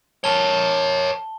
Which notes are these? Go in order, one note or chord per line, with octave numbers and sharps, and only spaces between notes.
A#4 C#5 A5 G7